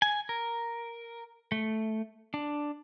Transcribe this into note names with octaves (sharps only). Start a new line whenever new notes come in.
G#5
A#4
A3
D4